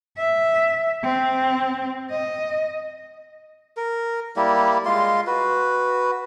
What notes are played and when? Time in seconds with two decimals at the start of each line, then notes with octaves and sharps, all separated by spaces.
0.18 E5
1.03 C4
2.11 D#5
3.77 A#4
4.36 G3 A#3 E4 G4
4.86 G#3 F4 C6
5.27 F#4 B4